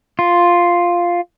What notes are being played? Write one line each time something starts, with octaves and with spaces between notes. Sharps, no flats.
F4